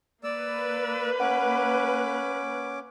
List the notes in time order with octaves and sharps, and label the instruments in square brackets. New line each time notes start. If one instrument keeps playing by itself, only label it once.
[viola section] A#3 B4 [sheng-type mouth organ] D5 E6
[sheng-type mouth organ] C#4 D6 [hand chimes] F#5